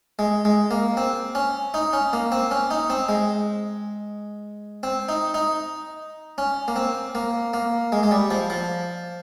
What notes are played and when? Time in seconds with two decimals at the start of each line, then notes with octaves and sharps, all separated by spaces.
0.19 G#3
0.45 G#3
0.71 A#3
0.97 C4
1.35 C#4
1.74 D#4
1.93 C#4
2.13 A#3
2.32 C4
2.51 C#4
2.71 D#4
2.90 C4
3.09 G#3
4.83 C4
5.09 D#4
5.34 D#4
6.38 C#4
6.68 A#3
6.76 C4
7.15 A#3
7.54 A#3
7.92 G#3
8.03 G#3
8.11 G3
8.31 F3
8.50 F3